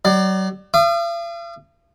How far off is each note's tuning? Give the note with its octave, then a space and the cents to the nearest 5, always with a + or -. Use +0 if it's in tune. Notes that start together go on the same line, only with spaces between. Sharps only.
F#3 +40 D5 +30
F5 -45 D#6 -35